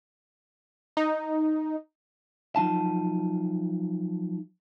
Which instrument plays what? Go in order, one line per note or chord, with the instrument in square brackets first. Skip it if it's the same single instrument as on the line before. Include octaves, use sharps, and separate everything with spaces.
[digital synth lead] D#4
[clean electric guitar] F3 F#3 D#4 A5